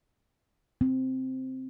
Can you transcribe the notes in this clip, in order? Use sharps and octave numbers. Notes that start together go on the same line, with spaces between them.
C4